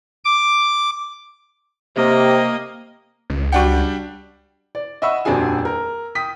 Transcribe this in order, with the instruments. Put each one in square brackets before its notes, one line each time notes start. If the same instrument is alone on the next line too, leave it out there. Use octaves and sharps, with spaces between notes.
[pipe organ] D6
[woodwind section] C3 [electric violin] A#3 D#5
[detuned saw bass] C#2
[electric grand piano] G3 D4 G5 [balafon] F#4 F#5
[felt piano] D5
D#5 E5 F#5 B5 C#6 E6
D#1 F2 D4 F#4 G#4 G#5
A#4
G5 D#6 B6